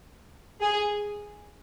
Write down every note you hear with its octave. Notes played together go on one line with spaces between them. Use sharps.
G#4